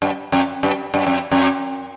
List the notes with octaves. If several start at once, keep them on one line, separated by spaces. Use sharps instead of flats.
F#2
F2
F#2
F#2
F2
F2